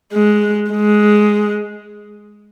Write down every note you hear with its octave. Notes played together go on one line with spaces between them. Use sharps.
G#3
G#3